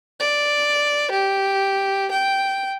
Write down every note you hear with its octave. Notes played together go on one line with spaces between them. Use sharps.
D5
G4
G5